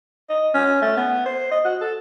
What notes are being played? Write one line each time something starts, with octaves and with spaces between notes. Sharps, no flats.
D#5
C#4
A3
B3
C5
D#5
F#4
A4